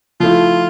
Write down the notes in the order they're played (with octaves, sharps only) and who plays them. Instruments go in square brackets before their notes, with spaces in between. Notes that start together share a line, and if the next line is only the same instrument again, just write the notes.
[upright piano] F3 A3 E4 [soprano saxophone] F4